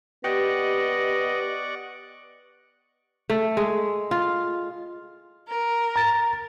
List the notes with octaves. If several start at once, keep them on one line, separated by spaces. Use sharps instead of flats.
B3 G4 D5 D#5 F#5 C#6
A3
G#3
F4
A#4
A#5 A6